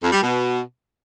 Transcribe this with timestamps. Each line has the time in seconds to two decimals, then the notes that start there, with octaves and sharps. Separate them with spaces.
0.02 F2
0.12 G3
0.21 B2